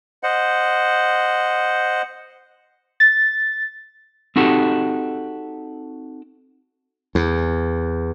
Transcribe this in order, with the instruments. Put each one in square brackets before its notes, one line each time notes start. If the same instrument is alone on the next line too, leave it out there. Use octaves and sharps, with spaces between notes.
[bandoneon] C5 D#5 F#5
[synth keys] A6
[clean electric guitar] C4 D#4 F#4 G4 A4
[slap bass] E2